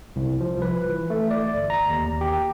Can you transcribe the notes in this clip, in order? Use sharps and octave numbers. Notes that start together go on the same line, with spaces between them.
C2
F3
B4
E3
A3
D5
G1
A#5
D#2
G4